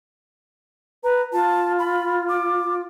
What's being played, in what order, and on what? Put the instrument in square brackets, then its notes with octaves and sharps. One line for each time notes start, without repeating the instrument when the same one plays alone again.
[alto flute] B4 [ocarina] A#5
[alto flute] F4 [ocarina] A5
[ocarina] B5
D6